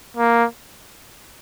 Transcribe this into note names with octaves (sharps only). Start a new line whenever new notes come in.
A#3